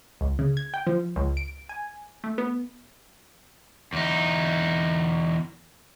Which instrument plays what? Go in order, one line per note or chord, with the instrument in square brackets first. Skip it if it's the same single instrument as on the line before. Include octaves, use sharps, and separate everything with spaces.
[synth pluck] C#2
C#3
G#6
G5
F3
C#2
D7
G#5
A3
B3
[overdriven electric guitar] E2 D#4